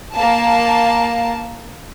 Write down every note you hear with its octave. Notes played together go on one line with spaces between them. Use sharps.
A#3 A5